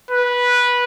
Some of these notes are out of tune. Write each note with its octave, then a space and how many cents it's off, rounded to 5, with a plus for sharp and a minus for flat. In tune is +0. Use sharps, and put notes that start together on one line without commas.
B4 -15